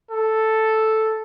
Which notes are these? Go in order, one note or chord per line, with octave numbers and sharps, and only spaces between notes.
A4